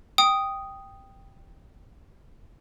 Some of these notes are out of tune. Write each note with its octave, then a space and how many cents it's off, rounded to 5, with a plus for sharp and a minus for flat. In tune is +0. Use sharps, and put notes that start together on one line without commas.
G5 +0 D#6 +0